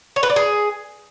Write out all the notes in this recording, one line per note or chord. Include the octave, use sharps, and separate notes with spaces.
C#5
B4
D5
G#4